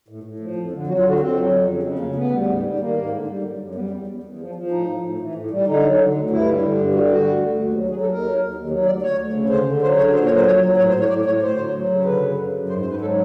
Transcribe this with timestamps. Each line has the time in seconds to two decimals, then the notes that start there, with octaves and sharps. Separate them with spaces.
0.09 A2
0.23 A2
0.40 F3
0.55 F2
0.72 D3
0.87 F#3 F#4
0.99 F4
1.03 D3
1.09 F#4
1.19 F2 C4
1.36 F#3
1.52 F2
1.67 C#3
1.83 C#3 C4
1.99 D2 A#3
2.15 D2 B3
2.31 G3
2.47 G#2
2.63 G3
2.79 D#3 A#3
2.96 G#2
3.11 D3
3.28 G3
3.43 F#2
3.59 F#2
3.75 G3 B3
3.91 E2
4.07 E2
4.23 E2
4.39 F3
4.55 F3
4.71 A2 D#4
4.87 A2
5.03 A2
5.19 E3
5.35 A2
5.51 G3
5.67 D3 D#4
5.83 F#3
5.98 D3
6.14 D2
6.30 G2 E4
6.47 G3
6.62 D3
6.78 G2
6.94 G3 F#4
7.11 D3 F#4
7.26 D2
7.43 D2
7.58 D#2
7.74 F#3
7.90 F#3 G#4
8.01 A4
8.06 D#2
8.12 A#4
8.22 F#3
8.38 D#2
8.54 D#2
8.70 F#3
8.86 D2 D5
9.02 D2 C#5
9.18 D2
9.33 C#3
9.50 D3 C5
9.65 D3
9.82 F#3 C5
9.97 D3 C#5
10.14 A#2 C5
10.25 C#5
10.30 F#3
10.36 C5
10.46 F#3 C#5
10.62 F#3
10.77 A2 C#5
10.89 C5
10.93 A2
10.99 C#5
11.09 A2 D5
11.25 A2 C#5
11.42 D2 C5
11.58 F#3
11.74 F#3
11.89 C#3
12.05 D3 B4
12.21 F#2
12.38 F#2
12.53 F#2
12.69 G#2 C5
12.81 C5
12.85 G#2 B4
13.01 F#3 A4